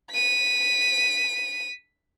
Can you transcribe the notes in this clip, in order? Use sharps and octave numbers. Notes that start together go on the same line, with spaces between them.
B6 D#7